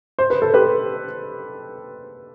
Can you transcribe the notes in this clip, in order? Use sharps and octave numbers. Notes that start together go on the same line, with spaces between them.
C5
B4
A4
G4 B4